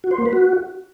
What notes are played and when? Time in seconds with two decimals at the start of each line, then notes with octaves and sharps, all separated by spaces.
0.04 F#4
0.11 C5
0.18 A#3
0.26 B4
0.33 F#4